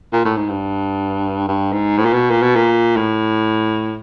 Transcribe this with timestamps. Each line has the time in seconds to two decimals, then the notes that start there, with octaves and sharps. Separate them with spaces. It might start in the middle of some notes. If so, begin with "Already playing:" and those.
0.13 A#2
0.25 A2
0.37 G#2
0.49 G2
1.48 G2
1.72 G#2
1.98 A2
2.05 A#2
2.13 B2
2.30 A#2
2.42 B2
2.55 A#2
2.97 A2